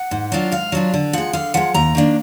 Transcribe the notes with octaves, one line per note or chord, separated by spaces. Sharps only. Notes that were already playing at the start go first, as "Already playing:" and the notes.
Already playing: F#5
G#2
F#3 D4 F4
G#2 F5
F#3 D4 F4
D3
F3 G#3 F#5
D3 F5
F3 G#3 F#5
D#2 A#5
D#3 A#3 D4